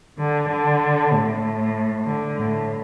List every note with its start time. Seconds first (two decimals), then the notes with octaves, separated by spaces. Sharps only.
0.19 D3
0.50 D3
1.13 A2
2.06 D3
2.38 A2